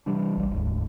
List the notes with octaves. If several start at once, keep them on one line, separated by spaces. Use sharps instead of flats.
C3 E3 G3 D4
A#1 G3
E1 D2 G#2